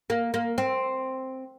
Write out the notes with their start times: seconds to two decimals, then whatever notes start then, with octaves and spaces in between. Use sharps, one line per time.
0.10 A#3
0.34 A#3
0.58 C4